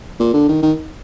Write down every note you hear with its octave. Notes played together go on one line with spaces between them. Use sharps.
A#2
D3
D#3
D#3